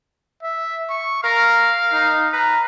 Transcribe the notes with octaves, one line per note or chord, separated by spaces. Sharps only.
E5
C#6
A#4 F5
D#4
B4 A#5